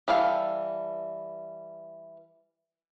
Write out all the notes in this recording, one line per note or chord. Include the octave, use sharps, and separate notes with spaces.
E3 G3 A4 F5